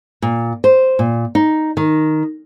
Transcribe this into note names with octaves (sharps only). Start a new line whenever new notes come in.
A#2
C5
A#2
D#4
D#3